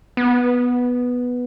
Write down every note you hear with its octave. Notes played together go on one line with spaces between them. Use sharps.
B3